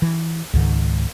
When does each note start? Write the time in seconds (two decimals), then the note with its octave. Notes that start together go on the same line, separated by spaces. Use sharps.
0.02 E3
0.54 C#2 G#2 D#3